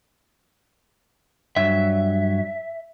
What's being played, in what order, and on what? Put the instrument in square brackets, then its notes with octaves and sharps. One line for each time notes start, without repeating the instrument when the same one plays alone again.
[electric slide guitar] G2 F#3 [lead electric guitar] E5